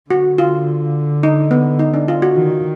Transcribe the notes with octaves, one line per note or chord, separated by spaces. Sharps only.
D3 F#4
F4
D#4
B3
D#4
D4
F4
F#4
D#3